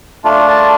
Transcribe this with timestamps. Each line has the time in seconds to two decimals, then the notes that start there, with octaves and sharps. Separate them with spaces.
0.24 A3 D4 F4
0.47 A5